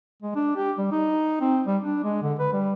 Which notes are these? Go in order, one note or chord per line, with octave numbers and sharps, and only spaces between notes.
G#3
D4
G4
G3
D#4
C4
G3
D4
G#3
D3
B4
G3